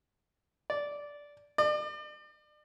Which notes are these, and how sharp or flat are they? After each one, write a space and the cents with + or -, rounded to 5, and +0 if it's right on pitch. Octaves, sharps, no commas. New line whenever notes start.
D5 -10
D5 +40